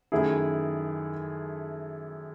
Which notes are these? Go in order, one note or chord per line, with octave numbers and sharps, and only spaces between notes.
F#2 D#3 A3 E4 G#4